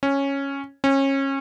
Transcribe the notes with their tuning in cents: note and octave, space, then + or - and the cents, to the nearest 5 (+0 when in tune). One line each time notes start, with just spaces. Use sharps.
C#4 -5
C#4 -25